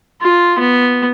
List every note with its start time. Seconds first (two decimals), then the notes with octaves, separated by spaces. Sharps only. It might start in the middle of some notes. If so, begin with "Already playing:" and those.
0.22 F4
0.59 B3